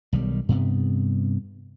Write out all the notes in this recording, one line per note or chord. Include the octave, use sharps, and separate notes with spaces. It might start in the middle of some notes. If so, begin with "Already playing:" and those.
B1 D#3 G3
G2 C3 B3